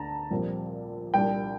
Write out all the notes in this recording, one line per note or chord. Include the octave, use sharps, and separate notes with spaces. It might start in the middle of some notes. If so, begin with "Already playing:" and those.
Already playing: D2 D3 A3 D4 A5 A#5
A#1 A#2 G3 C4
C2 A#2 G3 D4 G5